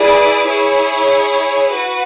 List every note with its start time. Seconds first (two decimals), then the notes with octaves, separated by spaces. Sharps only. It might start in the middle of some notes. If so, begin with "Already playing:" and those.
Already playing: E4 G#4 B4 D5
0.46 E4 G#4 C#5
1.72 F#4 B4